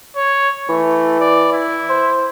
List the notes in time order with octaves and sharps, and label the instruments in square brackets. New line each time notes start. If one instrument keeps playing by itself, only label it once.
[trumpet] C#5
[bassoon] E3 [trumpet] A3
[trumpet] D5
E4
[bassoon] C5